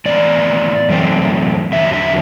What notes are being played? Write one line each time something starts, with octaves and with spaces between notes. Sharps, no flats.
A2 E3 B3 D5
F#2 E3 A3 C4
E2 D3 F#3 E5
E5